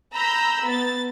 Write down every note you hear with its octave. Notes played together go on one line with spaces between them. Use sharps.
A#5 B5 E6 G6
B3 A6